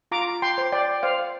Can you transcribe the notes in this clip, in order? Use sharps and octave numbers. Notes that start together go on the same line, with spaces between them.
F4 A#5 D6
G5 C6
C5
D5 G5
C5 F5